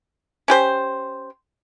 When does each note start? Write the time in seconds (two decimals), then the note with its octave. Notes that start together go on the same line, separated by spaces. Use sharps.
0.48 C#4 G4 C5